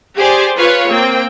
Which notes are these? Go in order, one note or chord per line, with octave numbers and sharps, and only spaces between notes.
G4 G#4 C5 D5
F4 B4 C#5 F5
A#3 C4 G5